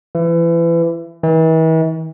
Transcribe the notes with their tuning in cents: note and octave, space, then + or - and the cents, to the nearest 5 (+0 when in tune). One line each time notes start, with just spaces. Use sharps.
E3 +30
E3 -40